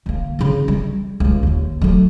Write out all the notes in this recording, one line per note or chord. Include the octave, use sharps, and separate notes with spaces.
D3 A#3
C#3 C4
G3
C#2 D3
D#2 D3
F#3 A3